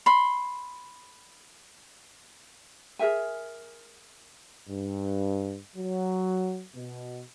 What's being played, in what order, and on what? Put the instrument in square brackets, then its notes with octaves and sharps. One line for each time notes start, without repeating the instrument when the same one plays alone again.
[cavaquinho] B5 C6
[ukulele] G#4 A#4 E5 G#5
[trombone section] G2
F#3
B2